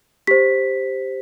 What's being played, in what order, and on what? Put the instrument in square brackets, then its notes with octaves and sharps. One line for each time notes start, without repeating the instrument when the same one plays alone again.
[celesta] G4 C5 B6